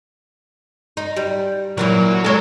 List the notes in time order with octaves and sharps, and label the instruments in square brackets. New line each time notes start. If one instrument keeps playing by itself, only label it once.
[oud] D#4
G3
[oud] A#2 E3 E4 [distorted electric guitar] F#3
[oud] G#3 C#5 [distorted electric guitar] A4 A#5